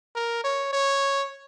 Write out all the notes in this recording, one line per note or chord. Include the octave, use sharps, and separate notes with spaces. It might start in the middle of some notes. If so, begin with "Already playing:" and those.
A#4
C#5
C#5